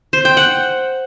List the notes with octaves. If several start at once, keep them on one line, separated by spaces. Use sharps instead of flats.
C5
G5
F#5